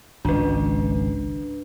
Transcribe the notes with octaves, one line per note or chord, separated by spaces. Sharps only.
G#1 C#2 D4 B4